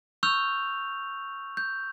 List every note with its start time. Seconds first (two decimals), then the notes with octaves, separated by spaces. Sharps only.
0.23 C#6 E6 F6 G6 F7
1.57 G6